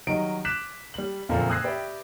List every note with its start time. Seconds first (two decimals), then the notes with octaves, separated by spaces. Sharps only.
0.07 D#3 F#3 G3 D#5 D7
0.45 D6 F#6 B6 E7
0.94 G3 F#7
1.29 F#1 F2 A#2 D3 A#3 A4
1.50 D#6 E6 F#6 G#6 A#6 C7
1.64 G4 B4 D5 E5 G5